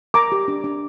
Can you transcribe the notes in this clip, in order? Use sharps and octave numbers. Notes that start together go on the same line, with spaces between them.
A#4 A#5 D6
G4
D4
D4